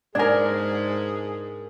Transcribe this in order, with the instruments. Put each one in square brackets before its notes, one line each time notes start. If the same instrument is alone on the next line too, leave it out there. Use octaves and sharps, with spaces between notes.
[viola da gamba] G#2 G#3 [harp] D4 A#4 [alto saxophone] G#4 [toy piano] D5 G#5